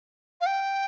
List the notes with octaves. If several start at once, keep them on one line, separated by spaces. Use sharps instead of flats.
F5
G5